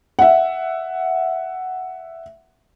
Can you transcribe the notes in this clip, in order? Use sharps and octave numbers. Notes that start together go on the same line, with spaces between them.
E5 F#5